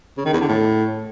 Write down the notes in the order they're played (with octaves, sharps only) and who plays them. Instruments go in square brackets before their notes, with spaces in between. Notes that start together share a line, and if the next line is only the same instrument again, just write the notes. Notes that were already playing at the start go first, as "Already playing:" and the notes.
[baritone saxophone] C#3
D#3
E2
D3
A2